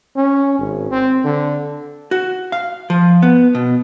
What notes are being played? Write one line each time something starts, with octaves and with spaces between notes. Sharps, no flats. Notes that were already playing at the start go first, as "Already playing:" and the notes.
C#4
G#1
C4
D3
F#4
F5
F3
B3
B2